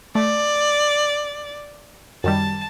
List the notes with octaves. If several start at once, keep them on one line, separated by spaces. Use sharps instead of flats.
A3 D5
F#2 D#3 G3 A5